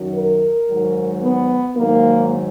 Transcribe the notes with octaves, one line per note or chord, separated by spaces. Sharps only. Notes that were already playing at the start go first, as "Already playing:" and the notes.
Already playing: F#2 D#3 F#3
A#4
G#2 D#3 F#3
B3
G#2 D#3 F#3 A#3